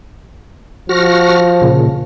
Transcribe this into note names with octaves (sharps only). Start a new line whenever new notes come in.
F3 F#4 F6 A#6
A#2 C#3